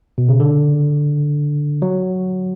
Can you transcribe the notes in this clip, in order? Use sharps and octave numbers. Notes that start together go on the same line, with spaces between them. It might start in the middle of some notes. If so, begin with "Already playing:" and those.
B2
C#3
D3
F#3